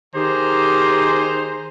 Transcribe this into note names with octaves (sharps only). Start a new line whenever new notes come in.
D#3 G4 G#4 C5 A#5